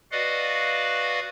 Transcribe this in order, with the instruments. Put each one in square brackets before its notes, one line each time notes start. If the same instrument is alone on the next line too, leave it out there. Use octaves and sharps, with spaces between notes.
[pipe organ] F#4 B4 D5 D#5 F5 F#5